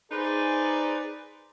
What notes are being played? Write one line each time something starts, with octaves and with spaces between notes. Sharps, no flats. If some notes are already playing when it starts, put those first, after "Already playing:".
D#4 G#4 B4 C5 D5